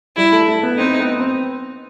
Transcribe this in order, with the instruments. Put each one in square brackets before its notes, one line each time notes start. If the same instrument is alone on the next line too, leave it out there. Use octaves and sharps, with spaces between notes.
[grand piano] G3 [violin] E4
[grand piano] A3
A3
B3
[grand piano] C4 [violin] D#4
[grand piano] B3
C4